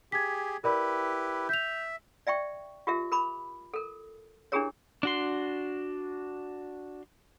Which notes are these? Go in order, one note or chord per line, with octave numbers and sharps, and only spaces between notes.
G4 G#4 G#6 B6
E4 G4 A#4 B4 D5 B5
E5 G6 F7
D5 E5 G5 C#6
F4 G4 A#4 E5
A#4 B5 D6
A4 A#4
D4 E4 G4 G#4 A#4 C#5
D4 F#4 C6